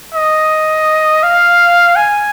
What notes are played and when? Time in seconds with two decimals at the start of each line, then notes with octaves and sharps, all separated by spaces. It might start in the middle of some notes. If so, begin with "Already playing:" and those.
0.14 D#5
1.23 F5
1.96 G#5